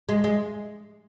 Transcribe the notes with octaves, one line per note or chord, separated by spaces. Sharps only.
G#3
G#3